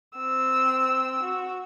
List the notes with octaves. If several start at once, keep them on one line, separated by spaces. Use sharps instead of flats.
C4 E6
F#4